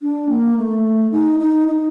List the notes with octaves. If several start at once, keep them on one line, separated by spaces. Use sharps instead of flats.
D4
A#3
A3
D#4
D#4
D#4